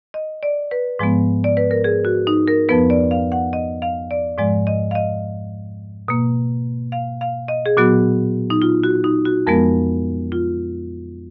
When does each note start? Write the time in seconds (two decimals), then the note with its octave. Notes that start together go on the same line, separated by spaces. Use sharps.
0.14 D#5
0.43 D5
0.71 B4
0.99 G#2 F3 G#3 B3
1.44 D5
1.57 B4
1.71 A#4
1.84 G#4
2.05 F#4
2.27 D#4
2.48 A#4
2.69 F2 F3 B3 B4
2.90 D5
3.11 F5
3.32 F#5
3.53 D#5
3.82 F5
4.11 D5
4.38 G#2 F3 G#3 D5
4.67 D#5
4.91 F5
4.95 D#5
6.08 B2 A#3
6.92 F5
7.21 F5
7.48 D#5
7.66 G#4
7.77 A#2 F#3 B3 F#4
8.50 D#4
8.62 F4
8.83 F#4
9.04 D#4
9.25 F#4
9.47 F2 F3 G#3 B3 A#4
10.32 F4